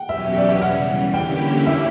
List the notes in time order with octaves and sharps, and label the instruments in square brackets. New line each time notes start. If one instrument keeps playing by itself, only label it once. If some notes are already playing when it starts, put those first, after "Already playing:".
Already playing: [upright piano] F#5 G5
[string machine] E2 B2 F#3 C#4 G4 [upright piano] E5
[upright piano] D5
E5
[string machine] C#3 E3 G3 [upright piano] F#5
[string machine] D3 A#3 C#4 E4 G4 [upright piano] G5
[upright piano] E5